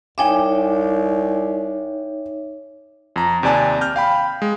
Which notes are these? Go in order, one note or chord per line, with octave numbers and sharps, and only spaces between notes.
C2 D#4 C#5 E5 G5 G#5 D6
F2 A#5
D#2 C3 D5 G#5 A5
F6 G6
F5 G5 B5
G#3